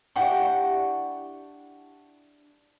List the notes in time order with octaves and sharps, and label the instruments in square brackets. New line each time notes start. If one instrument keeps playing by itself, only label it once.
[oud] D4 E4 G4 [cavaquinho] F#5 G5 C#6